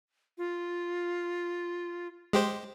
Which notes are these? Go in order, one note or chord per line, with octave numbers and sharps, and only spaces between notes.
F4
G#3 G4 C5